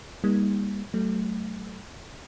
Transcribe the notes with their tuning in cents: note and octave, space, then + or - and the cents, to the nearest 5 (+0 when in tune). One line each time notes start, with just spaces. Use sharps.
G3 +40 A#3 +25 D#4 +15
F#3 +40 A3 +5